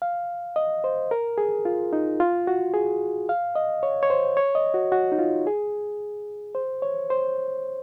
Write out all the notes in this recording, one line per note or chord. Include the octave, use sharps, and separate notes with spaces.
F5
D#5
C5
A#4
G#4
F4
D#4
F4
F#4
G#4
F5
D#5
C#5
C#5
C5
C#5
D#5
F#4
F#4
D#4
F4
G#4
C5
C#5
C5